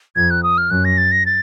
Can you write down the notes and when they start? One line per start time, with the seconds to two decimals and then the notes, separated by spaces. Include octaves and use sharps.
0.16 F2 G#6
0.30 F#6
0.43 D#6
0.58 F6
0.70 F#2 F#6
0.85 A#6
0.98 A6
1.12 A#6
1.26 A6